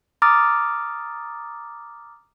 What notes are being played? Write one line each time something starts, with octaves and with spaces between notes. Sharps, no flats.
A#5 D6 D#6 F6 A6